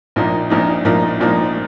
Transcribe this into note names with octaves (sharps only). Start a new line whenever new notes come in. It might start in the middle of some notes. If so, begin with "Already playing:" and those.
A#1 A#2 F3 A#3 D#4
A#1 A#2 F3 A#3 D#4
A#1 A#2 F3 A#3 D#4
A#1 A#2 F3 A#3 D#4